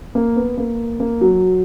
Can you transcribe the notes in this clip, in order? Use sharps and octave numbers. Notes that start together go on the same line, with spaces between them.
A#3
B3
A#3
A#3
F#3